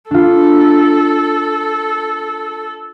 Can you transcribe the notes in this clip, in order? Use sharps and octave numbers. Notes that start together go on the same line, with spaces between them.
D4 F4 A4